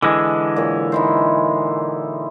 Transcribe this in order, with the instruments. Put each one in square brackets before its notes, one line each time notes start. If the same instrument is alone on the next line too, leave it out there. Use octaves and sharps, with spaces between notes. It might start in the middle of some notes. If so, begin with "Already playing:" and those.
[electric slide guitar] D3 E3 G#3 [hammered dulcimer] A4
[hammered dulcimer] A#2 C#5
D#4 E4 C5